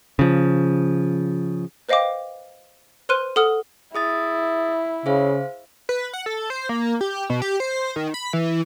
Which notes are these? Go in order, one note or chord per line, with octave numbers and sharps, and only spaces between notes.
C#3 F3
B4 C5 D#5 F5 G5 D6
B4 C5 C6 F6 F#6 D#7
A4 F#5 D#6 F6
E4 G#4 D#6 A6
C#3 G#4 C5 F5
B4
F#5
A4
C5
A#3
G4
B2
G4
C5
D#3
B5
E3